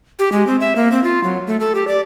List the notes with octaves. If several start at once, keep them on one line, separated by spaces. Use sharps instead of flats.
G4
G#3
C4
E5
A#3
C4
F4
F#3
A3
A4
G4
D5